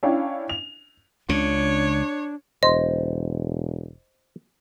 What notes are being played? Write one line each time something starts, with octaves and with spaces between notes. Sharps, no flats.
C#4 D4 E4 F5 G5
F7
C#2 C#3 D4 C#5
E1 C5 D#5